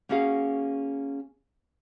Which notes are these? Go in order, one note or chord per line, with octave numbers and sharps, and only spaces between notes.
A#3 C#4 F#4 G#4 F5